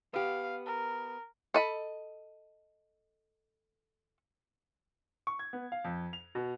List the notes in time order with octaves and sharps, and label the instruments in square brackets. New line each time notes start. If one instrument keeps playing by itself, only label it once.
[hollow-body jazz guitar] B3 G4 [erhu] F5
[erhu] A#4
[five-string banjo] A4 D#5 B5
[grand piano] C#6
G#6
B3
F5
F2
F7
B2